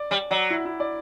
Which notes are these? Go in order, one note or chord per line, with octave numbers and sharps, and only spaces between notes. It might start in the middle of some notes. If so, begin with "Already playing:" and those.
Already playing: D5
G3 D5
F#3 D5
E4
E4
D5